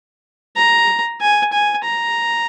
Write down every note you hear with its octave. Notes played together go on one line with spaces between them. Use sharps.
A#5
G#5
G#5
A#5